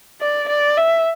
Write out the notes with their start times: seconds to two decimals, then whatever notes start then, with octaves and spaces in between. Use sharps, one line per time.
0.21 D5
0.49 D5
0.77 E5